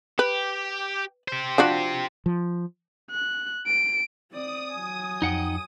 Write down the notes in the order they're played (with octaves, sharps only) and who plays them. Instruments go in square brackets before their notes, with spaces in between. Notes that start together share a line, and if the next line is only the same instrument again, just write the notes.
[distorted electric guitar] G4 [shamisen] B4
[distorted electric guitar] G4 C5
[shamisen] F3 D4 F#4
[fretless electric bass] F3
[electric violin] F#6
D7
[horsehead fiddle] C4 D5 [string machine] D#6
[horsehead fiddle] F#3 G#5
[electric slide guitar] F2 [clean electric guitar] D#4 F#5 G5